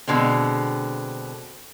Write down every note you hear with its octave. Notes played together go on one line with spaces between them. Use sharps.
B2 D3 G#3 C4